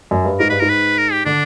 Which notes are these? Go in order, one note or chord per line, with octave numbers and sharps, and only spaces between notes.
F#2
G2
G#2 A#4
G2 B4
G#2 A#4
B4
A#4
G4
D3 D4